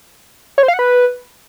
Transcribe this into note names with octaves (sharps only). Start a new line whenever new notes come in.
C#5
C5
F5
F#5
B4